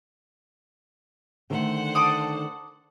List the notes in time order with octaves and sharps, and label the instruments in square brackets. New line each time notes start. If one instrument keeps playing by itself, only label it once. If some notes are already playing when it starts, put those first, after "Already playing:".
[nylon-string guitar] D3 D#3 A3 [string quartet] C5 F#5
[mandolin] A5 D6 D#6